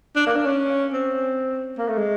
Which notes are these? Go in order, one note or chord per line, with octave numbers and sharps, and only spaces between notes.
D4
A#3
D4
C#4
C4
A#3
A3
G#3